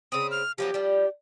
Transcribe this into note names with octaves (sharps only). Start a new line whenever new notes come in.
C#3 C4 D#6
F6
F3 F#3 B3 G4
F3 G3